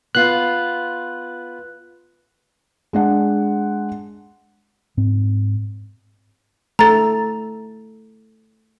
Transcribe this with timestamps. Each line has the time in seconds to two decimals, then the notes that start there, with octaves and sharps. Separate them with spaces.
0.15 B3 F4 F#6
2.93 G#3 D4 F#5
4.97 G#2 C4
6.79 A3 A4 A#5 A6